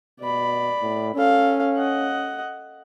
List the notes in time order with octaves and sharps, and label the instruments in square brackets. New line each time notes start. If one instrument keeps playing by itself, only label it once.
[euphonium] B2 [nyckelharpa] D5 B5
[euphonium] A2
[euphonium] C#4 [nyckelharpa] A4 F5
[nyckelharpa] D#5 F#5